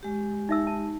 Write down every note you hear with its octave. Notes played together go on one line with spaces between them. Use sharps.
G#3 G4
D#4 E5 E6
A5